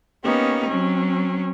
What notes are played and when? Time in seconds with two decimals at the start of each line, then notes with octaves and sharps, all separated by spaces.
0.22 A#3 B3 C#4 D#4 G4
0.69 F#3 C4 C#4